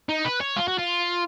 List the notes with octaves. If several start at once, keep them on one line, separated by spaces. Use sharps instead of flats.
D#4
B4
C#5
F4
F#4
F4